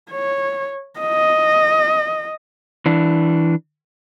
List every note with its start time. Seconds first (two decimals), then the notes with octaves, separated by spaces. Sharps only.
0.11 C#5
1.00 D#5
2.86 E3 D4